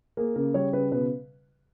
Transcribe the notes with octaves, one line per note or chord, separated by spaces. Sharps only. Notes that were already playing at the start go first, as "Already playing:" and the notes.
A#3 G#4
C#3 A#4
G3 C#5
C#3 B4
B2 B4